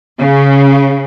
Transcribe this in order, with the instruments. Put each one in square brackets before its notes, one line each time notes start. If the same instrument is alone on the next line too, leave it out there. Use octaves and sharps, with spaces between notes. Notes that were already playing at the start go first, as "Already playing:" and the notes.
[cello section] C#3